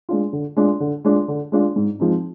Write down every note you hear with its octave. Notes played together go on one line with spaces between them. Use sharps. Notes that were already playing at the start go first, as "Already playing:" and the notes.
G#3 D4 F4
D3
G#3 D4 F4
D3
G#3 D4 F4
D3
G#3 D4 F4
G#2
F3 G#3 C4 D#4